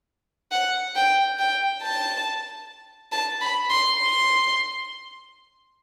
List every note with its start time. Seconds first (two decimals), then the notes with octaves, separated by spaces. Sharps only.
0.52 F#5
0.96 G5
1.39 G5
1.82 A5
3.12 A5
3.41 B5
3.70 C6
3.99 C6